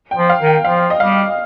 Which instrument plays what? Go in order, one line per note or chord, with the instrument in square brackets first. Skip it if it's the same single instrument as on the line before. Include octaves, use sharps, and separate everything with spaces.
[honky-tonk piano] G5
[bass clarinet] F3
[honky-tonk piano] F5
[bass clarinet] D#3
[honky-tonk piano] G5
[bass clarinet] F3 [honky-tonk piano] F5
[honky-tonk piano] D#5
[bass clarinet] G3 [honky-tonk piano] F5